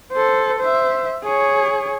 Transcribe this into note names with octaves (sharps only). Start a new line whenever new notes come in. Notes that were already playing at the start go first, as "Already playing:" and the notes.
A4 C5
C5 E5
G#4 C#5